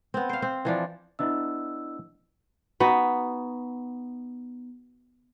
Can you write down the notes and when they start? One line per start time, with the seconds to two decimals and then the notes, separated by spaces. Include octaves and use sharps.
0.14 B3 C4
0.29 C5 F5
0.42 C4
0.65 E3 F3 D4
1.19 B3 D4 E4 D#5 E5 E6
2.80 B3 D#4 F#4